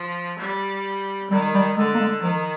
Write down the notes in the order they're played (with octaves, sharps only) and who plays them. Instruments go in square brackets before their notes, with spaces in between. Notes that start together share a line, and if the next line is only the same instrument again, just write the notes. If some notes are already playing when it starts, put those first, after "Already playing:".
Already playing: [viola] F3
G3
[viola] D#3 [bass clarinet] G3
[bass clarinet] G3
[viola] D3 [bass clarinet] G#3
[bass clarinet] A#3
G#3
[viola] D#3 [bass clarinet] F3